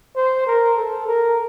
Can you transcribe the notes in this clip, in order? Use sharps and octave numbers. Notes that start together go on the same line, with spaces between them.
C5
A#4
A4
A#4